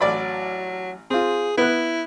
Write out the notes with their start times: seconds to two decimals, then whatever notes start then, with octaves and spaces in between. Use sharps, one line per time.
0.01 A1 F#3 D5 B5
1.10 C4 F4 G#4
1.57 B3 E4 F#6